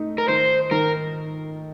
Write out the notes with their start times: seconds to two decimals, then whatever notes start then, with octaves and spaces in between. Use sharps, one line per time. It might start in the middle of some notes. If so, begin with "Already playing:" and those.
Already playing: A3 D#4
0.18 A#4
0.28 D#3 C5
0.71 D#3 A#4